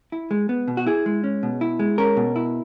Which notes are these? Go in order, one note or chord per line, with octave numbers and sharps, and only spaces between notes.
E4
G#3
B3
B2
F#4
E4 G#4
G#3
C#4
B2
E4
G#3
C#4 A#4
B2
E4